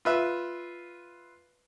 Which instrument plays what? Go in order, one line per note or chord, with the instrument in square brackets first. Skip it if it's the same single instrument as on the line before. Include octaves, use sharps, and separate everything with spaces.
[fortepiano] F4 B4 E5